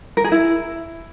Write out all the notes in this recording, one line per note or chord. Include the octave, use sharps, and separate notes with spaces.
A#4
G#4
E4